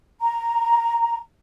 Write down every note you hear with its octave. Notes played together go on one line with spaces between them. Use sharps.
A#5